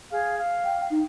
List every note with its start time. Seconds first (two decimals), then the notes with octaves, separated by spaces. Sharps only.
0.09 G#4 F5
0.38 F5
0.65 G5
0.90 D#4